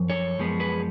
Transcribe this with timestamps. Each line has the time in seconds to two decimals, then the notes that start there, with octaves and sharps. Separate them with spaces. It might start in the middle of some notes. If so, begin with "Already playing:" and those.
Already playing: F#2 F3
0.10 A4 C#5
0.38 F#2 F3 G#3 B3
0.60 G#4 B4